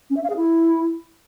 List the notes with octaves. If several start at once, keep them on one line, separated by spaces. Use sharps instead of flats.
C#4
E5
F5
G#4
E4